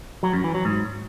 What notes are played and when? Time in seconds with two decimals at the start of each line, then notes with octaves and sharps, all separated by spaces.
0.23 F#3
0.33 F#2
0.44 E3
0.54 F#3
0.65 G#2